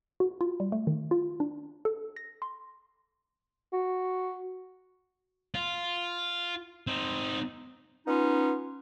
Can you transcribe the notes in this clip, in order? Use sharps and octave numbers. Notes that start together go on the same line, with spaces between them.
F#4
F4
G3
A3
D#3
F4
D4
A4
A#6
C6
F#4
F4
C4 D#4
B3 C#4 D#4 F4